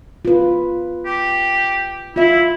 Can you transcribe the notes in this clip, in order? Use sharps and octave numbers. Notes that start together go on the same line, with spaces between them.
F4 B4
G4
E4 F4 E5